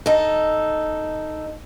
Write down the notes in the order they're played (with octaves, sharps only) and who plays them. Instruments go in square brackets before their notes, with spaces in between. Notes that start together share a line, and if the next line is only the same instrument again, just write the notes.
[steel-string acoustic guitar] D#4 A4